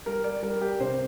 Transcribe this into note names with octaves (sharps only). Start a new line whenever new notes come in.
G3 A#4
D5
G3 A#4
G4
C3 C5